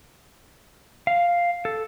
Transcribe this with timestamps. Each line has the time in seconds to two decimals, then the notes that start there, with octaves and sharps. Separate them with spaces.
1.07 F5
1.65 A4